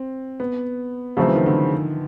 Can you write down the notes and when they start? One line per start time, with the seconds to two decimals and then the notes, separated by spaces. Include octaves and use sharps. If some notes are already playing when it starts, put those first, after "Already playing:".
Already playing: C4
0.40 B3
1.17 C#3 F3 F#3 A3 C4
1.27 E3
1.36 D#3
1.46 D3